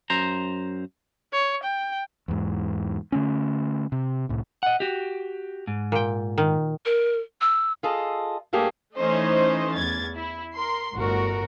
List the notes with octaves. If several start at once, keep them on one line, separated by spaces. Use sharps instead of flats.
F#2 C5 A#5
C#5
G5
E2 G#2
D3 A3 C#4
C3
C2 A2
D#5 F#5
F#4 G4
G#2
A#2 G5
D#3
A#4
E6
F4 G#4 A4 D#5
G2 A3 A#3 G4 G#4
E3 A3 C#4 D#4 C5 D#5
E2 G#6 A6
E4
A#4 C6
G1 A2 F#4 A#4